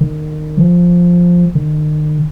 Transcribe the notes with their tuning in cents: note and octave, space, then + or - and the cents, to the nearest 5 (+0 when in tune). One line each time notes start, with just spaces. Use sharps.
D#3 -25
F3 +5
D#3 -40